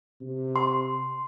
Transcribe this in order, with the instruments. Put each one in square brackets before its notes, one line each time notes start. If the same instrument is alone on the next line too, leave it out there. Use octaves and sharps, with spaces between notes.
[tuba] C3
[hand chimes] C6